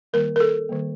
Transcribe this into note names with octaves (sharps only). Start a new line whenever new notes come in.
D#3 G3 A#3 A#4
A#4
A4
D#3 G3 A#3